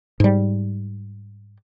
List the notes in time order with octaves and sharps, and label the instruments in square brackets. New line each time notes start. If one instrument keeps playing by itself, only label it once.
[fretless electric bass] G#2 G3